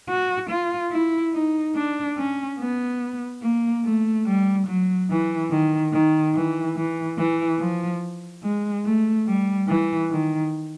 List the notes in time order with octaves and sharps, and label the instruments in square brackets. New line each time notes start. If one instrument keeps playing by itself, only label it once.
[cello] F#4
F4
E4
D#4
D4
C#4
B3
A#3
A3
G3
F#3
E3
D#3
D#3
E3
E3
E3
F3
G#3
A3
G3
E3
D#3